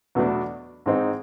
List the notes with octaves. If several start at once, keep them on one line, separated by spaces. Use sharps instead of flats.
E2 B2 F#3 A3 D4
G#2 E3 G#3 C4 D#4